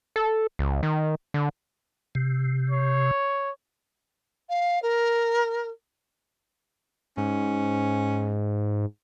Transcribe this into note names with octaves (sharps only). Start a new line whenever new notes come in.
A4
C#2
D#3
D3
C3
C#5
F5
A#4
G#2 C#4